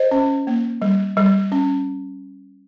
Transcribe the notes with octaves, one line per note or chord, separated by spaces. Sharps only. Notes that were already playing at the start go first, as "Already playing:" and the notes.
Already playing: C5 D#5
C#4
A#3
G3
G3
C#4